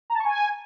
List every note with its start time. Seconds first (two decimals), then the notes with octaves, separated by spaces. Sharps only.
0.10 A#5
0.15 A5
0.20 C#6
0.25 G#5